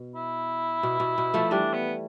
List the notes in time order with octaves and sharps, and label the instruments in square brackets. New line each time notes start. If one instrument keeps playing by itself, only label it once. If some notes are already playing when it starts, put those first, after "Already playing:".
Already playing: [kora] B2
[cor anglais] E4
[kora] B2
B2
B2
F3 A3
[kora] E3 G3 [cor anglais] D4
[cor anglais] B3